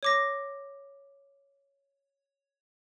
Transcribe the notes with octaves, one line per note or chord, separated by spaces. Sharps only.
C#5 D6 A#6